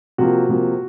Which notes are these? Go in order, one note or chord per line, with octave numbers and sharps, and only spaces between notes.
C3 F3 A#3 F#4
C3 F3 A#3